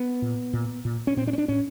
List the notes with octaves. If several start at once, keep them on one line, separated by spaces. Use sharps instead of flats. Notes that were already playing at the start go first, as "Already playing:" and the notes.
Already playing: B3
A#2
A#2
A#2
C#4
A#2 C4
D4
C#4
D4
A2 C#4